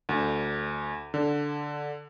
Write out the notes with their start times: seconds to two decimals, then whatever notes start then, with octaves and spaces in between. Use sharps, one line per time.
0.09 D2
1.14 D3